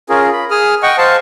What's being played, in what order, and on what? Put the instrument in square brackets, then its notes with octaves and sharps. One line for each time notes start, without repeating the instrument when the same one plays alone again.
[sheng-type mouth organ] C#4 F4 G#4 A#4
B5
G#4 D#6 F6
D#5 F#5 G5 C#6
C5 F5 A5